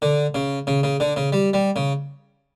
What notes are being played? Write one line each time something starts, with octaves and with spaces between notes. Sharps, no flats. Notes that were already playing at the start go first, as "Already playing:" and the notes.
D3
C#3
C#3
C#3
D3
C#3
G3
G3
C#3